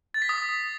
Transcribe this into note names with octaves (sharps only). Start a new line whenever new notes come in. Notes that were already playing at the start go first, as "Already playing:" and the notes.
A6
B6
D#6